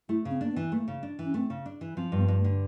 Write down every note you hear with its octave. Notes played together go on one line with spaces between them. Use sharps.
A3 E4
C#3
C4
A#3 D4
B3
E3
A3 A#3
C#3
D4
E3
C#4
A3 C4
C#3
D4
E3
F3 C4
G2
B3
G2
A3
D3